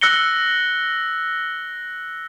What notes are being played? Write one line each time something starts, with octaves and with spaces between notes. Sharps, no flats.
E6 F#6 A#6 C#7 G7